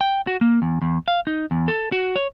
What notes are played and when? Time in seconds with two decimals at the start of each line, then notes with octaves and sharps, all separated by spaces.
0.01 G5
0.27 F#4
0.41 A#3
0.62 E2
0.82 E2
1.08 F5
1.27 D#4
1.51 E2
1.68 A4
1.92 F#4
2.16 C#5